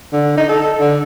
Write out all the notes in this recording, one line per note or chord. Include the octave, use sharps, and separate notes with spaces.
D3
D#4
A4
D3